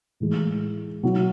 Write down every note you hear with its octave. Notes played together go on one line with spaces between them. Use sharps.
A2 E3 G#3
B2 F#3 B3 E4